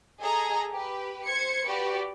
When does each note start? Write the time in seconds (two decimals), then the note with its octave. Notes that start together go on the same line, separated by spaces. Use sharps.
0.21 G#4 A4 D#5 G#5 A#5
0.72 G4 B4
1.26 C5 G#6 C#7
1.67 F#4 G4 B4 D5